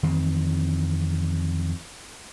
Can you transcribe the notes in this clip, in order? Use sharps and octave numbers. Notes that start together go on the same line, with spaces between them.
F2 D#3 E3 C4